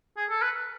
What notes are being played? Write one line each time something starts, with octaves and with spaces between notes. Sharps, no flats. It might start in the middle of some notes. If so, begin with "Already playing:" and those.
G#4
A4
B4